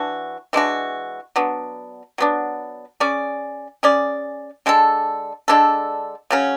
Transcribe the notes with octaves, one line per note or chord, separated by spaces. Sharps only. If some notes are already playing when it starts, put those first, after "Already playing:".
Already playing: E3 D4 F#4
E3 G#3 D4 F#4
F#3 B3 D4
F#3 B3 D4
C#4 G#4 D5
C#4 G#4 D5
D3 G#3 D4 A4
D3 G#3 D4 A4
C#3 F#3 C#4